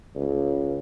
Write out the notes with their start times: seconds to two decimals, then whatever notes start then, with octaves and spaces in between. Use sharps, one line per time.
0.15 C#2